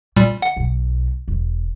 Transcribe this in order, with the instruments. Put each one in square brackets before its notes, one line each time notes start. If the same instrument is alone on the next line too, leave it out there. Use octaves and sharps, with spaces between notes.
[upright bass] D2 [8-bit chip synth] A#2 G3
[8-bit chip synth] F#5
[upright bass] B1 B2
E1